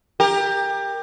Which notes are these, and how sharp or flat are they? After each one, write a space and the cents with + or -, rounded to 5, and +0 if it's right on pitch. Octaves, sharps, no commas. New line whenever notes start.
G4 +20 A#4 +0